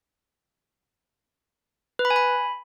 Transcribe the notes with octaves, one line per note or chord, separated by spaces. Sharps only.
B4
B5
G#5
B5